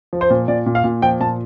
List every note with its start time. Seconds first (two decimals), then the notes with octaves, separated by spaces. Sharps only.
0.13 F3
0.21 C5
0.30 A#2
0.48 A#2 D5
0.66 A#2
0.75 F5
0.84 A#2
1.02 F3 G5
1.20 A#2 A5